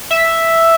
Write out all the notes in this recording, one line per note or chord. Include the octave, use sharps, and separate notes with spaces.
E5